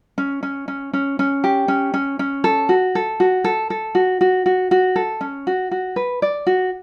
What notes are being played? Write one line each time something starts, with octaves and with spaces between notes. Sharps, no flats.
C#4
C#4
C#4
C#4
C#4
G4
C#4
C#4
C#4
A4
F#4
A4
F#4
A4
A4
F#4
F#4
F#4
F#4
A4
C#4
F#4
F#4
B4
D5
F#4